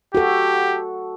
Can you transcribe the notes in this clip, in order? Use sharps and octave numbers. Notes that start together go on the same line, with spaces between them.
F#4 G4 A4